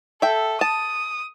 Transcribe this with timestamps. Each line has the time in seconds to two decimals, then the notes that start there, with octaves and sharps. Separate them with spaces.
0.22 A4 E5 G5
0.61 A5 D#6